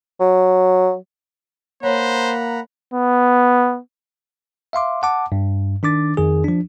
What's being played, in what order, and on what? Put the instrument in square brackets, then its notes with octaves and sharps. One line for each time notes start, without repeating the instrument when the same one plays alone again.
[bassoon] F#3
[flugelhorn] A#3 [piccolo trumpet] C5 [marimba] C#5 [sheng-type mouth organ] F#5 A#5 B5
[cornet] B3
[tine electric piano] E5 F5 C6 D6
F#5 A5 D6
G2
D#3 D4 D6 A6
F2 D#3 G#4
F3 D4